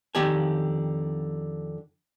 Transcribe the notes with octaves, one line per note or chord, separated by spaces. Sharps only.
F2 D3 D#3 G4 D5 G#5